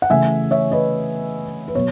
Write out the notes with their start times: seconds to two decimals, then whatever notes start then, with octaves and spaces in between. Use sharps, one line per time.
0.02 F#5
0.10 C#3 E3 A3 E5 G#5
0.51 C#5 E5
0.71 B4 D#5
1.68 B4
1.75 B2 F#3 B3 C#5